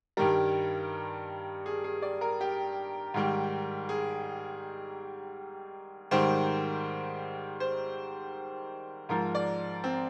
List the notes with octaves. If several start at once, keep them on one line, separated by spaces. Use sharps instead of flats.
G2 D#3 G3 A#4
G#4
G#4
D5
A#4
G4
G#2 D#3 G3
G#4
G#2 D#3 G3 C5
C5
G#2 F3 A#4
D5
C4